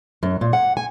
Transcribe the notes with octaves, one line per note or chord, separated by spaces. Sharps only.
F#2
A#2
F#5
G#5